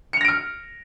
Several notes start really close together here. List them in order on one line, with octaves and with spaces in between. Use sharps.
C#7 F7 A#6 D7 F6